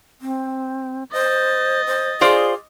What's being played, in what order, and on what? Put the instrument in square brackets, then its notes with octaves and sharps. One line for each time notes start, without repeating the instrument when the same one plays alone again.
[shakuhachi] C4
[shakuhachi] C5 [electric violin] D#5 A6
[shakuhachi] C5
[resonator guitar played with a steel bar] F4 C5 D5 [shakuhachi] G#4